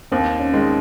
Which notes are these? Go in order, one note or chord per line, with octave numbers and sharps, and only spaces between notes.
D#2 C4
C#4
D#3 G#3